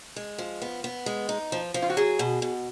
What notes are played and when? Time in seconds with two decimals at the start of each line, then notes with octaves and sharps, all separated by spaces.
0.16 G#3
0.38 F3
0.62 B3
0.84 B3
1.06 G#3
1.29 D#4
1.52 F3
1.74 F3
1.82 F4
1.90 F#4
1.97 F#3 G#4
2.19 B2
2.42 B2